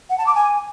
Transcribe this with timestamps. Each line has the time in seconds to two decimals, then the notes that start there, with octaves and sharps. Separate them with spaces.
0.10 F#5
0.18 A5
0.27 D6
0.35 G#5